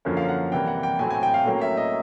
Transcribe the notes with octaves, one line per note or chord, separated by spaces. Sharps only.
F#2 D3 F3 A#3 C#4
F5
F#5
C3 E3 G3 A#3 G5
F#5
G5
A2 F#3 A3 C4 G#5
G#5
G5
F5
A2 F#3 A#3 C#4
E5
D#5